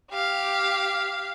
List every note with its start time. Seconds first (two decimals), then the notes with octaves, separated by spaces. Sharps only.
0.11 G4 F5